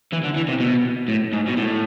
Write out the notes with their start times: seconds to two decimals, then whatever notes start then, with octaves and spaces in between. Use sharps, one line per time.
0.12 E3
0.23 D3
0.36 E3
0.48 C3
0.60 B2
1.08 A2
1.33 G#2
1.47 B2
1.57 A2